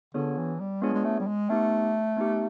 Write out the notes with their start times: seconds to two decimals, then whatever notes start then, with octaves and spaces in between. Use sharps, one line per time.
0.14 D3 B3 D4 F4 G#4 C#5
0.38 E3
0.60 G3
0.82 G#3 B3 D4 F4 G#4 C#5
0.94 G#3
1.05 A3
1.20 G3
1.27 G#3
1.49 A3 B3 D#4 G4
2.17 B3 D#4 G4